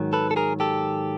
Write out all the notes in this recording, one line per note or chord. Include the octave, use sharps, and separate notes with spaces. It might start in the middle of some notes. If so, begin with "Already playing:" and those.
Already playing: G#2 D#3 F#3
A4 B4
A4
G#4 A#4
G4 A4